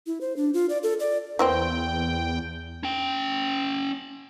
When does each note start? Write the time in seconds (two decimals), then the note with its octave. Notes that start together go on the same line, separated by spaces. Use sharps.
0.06 E4
0.21 C5
0.36 D4
0.54 F4
0.69 D5
0.83 A4
1.00 D5
1.39 E2 E3 A#3 C4 G5
2.83 C#4 G5